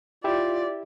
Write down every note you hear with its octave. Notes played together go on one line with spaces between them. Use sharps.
E4 F4 G4 D5 E5